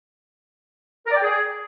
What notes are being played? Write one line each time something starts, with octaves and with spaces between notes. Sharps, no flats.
A#4
D5
G5
G#4